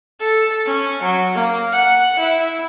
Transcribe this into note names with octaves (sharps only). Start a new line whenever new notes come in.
A4
C#4
F#3
A#3
F#5
E4